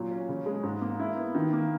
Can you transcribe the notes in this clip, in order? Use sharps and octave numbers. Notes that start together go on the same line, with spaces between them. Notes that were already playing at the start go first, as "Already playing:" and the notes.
Already playing: A#2 F#3
C#4
C#3
G#3
G#2
A#3
E4
B3
D#3
A#3